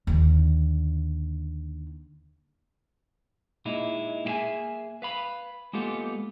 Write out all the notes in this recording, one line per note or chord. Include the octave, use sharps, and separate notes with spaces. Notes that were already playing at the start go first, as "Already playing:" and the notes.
D#2 D3
A#2 G#3 D#4 E4
A#3 G4 G#4 E5 G#5
B4 F5 B5
G#3 A#3 B3 F4 G4 A4